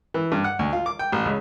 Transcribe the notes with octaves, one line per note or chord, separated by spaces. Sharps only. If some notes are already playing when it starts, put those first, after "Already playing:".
E3
G2
F#5
D2
F4
D6
G5
A1
C#2